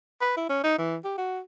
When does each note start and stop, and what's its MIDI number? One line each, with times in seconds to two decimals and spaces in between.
0.21 0.37 71
0.37 0.46 64
0.49 0.61 61
0.64 0.78 63
0.78 0.97 52
1.04 1.16 67
1.18 1.40 66